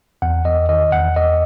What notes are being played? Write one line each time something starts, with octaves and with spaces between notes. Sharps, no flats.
E2 F#5
E2 D#5
D#3 D#5
E2 F#5
E2 D#5